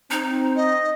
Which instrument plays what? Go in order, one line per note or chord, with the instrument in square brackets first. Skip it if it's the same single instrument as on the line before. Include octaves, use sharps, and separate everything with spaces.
[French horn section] C4 [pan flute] D#4
[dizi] D#5